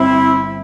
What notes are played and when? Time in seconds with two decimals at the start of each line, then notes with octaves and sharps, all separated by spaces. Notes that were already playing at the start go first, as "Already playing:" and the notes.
Already playing: G1 C4 E4